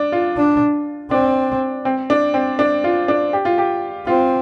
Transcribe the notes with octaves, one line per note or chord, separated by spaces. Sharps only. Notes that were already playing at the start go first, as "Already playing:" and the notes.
Already playing: D4
F4
D4
C4 D4
C4
D4
C4
D4
F4
D4
G4
F4
G4
C4 F4